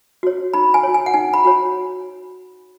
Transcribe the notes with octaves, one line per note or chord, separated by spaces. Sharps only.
F#4 C#5
D#4 B5
G#5
F#4 C#5
G#5
F#5
D#4 G#5
B5
F#4 C#5